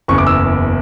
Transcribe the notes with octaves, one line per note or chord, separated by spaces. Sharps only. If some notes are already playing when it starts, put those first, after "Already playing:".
F#1 E2 C#3 C#6
D6
E6